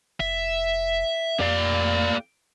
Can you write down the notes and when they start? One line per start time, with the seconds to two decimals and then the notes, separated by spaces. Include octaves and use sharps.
0.20 F1 E5
1.40 F2 A#3 G4 D5 F5